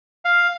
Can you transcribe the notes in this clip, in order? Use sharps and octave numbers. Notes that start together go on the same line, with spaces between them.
F5